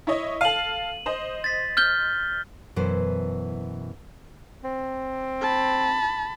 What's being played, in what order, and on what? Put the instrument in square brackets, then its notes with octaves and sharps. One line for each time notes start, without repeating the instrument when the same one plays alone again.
[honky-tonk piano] E4 C#5 D#5
[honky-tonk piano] A4 F5 [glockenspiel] D#7 F#7
[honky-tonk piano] C5 D#5
[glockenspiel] A6 B6
F6 G6 G7
[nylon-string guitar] F#2 B2 E3 E4 C5
[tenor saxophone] C4
[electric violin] A5 B5